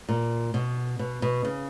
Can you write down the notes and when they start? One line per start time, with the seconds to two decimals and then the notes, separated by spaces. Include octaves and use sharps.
0.09 A#2
0.54 B2
0.99 B2
1.22 B2
1.45 C#3